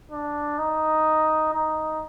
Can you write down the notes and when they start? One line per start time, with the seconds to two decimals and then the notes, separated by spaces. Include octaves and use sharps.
0.11 D4
0.59 D#4
1.54 D#4